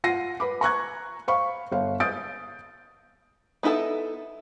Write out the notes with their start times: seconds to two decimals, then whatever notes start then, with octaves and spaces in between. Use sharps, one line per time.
0.04 F4 F#5 A#6 C7 D#7
0.40 B4 B5 D6
0.61 A#5 C#6 F#6 G#6
1.28 C5 F5 B5 C#6
1.72 G1 F5
2.00 D#6 G6 A6 D7
3.63 B3 D#4 E4 G#4 A4